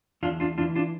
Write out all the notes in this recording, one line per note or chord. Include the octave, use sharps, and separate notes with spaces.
E2 D4 F4
D4 F4
E3 D4 F4
D4 F4